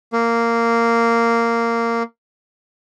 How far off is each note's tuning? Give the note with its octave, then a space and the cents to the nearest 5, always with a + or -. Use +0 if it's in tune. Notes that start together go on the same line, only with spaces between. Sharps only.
A#3 -10